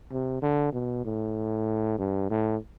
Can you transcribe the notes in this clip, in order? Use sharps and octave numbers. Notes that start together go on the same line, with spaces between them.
C3
D3
B2
A2
G2
A2